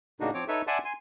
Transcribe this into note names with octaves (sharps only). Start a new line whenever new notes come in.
A2 C#3 A#3 D4 D#4 F#4
F3 C4 C#5 D6
D#4 A4 B4 C#5 E5
D5 E5 F#5 G#5 A5 C6
G#5 C6